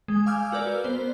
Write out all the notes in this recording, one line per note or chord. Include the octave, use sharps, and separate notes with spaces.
G#3
F5 G#5 D6 E6 F6 G6
F#4 A#4 B4 D5
B3 C5